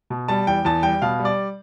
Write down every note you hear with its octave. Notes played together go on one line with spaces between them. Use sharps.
B2
G3 A5
E2 G5
E2 A5
G3 G5
B2 F5
G3
D5